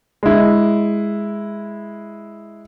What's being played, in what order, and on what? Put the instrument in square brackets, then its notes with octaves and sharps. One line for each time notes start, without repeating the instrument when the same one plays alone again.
[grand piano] G#3 E4